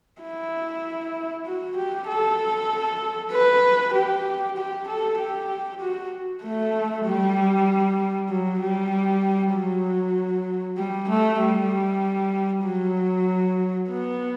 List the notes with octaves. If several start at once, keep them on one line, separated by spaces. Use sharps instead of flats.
E4
F#4
G4
A4
B4
G4
G4
A4
G4
F#4
A3
G3
F#3
G3
F#3
G3
A3
G3
F#3
B3